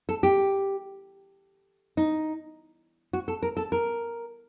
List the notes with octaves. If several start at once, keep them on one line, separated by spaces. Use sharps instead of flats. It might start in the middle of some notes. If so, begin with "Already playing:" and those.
A4
G4
D#4
F#4
A4
A#4
A4
A#4